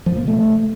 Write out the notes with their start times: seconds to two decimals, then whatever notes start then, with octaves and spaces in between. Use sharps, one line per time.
0.06 F3
0.12 A#2
0.17 A#3
0.22 C3
0.28 A3